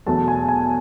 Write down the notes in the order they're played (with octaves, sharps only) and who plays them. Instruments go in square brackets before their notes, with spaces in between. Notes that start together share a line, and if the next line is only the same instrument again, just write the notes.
[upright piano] E2 B2 F#3 A3 A5
G#5
G#5